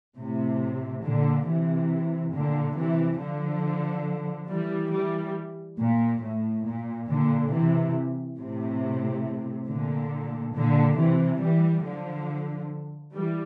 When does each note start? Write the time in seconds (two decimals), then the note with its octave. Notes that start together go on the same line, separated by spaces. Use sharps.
0.16 A2 C3
1.03 A#2 D3
1.46 C3 E3
2.33 A#2 D3
2.76 C3 E3
3.19 D3 F3
4.48 E3 G3
4.92 E3 G3
5.79 A#2
6.21 A2
6.65 A#2
7.08 A#2 D3
7.51 C3 E3
8.38 A2 C3
9.67 A#2 D3
10.54 A#2 D3
10.97 C3 E3
11.40 E3 G3
11.84 D3 F3
13.13 E3 G3